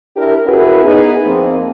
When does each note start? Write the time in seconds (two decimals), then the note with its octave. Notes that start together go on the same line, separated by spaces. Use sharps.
0.16 D4 E4 G4 A#4
0.46 C#4 E4 F#4 G#4 A#4 B4
0.85 B3 D#4 G#4
1.25 F2 A#3 C4